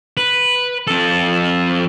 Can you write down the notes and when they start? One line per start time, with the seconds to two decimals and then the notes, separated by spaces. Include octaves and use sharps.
0.17 B4
0.87 F2 A4